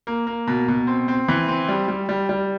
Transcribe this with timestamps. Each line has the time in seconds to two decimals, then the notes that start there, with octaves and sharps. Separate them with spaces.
0.07 A#3
0.27 A#3
0.47 B2
0.68 B2
0.87 C4
1.08 C4
1.28 E3
1.48 C4
1.69 G3
1.88 G3
2.09 G3
2.29 G3